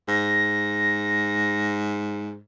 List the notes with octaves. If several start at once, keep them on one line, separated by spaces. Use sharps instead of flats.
G#2 A#6